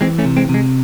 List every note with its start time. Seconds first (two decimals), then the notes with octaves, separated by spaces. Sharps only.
0.01 E3 G#3 C4
0.18 A3 C#4
0.25 C3
0.37 G#3 C4
0.49 C3
0.54 G#3